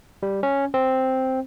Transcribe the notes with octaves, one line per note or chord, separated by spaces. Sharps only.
G3
C#4
C4